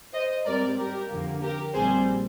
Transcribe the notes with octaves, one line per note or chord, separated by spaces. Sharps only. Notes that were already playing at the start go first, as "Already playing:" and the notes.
C5 D#5
G#2 G3 C4 A#4 D5
G4 A#4
F2 D3 F3 A#3
G4 A#4
A#1 A#2 G3 C4 G#4 C5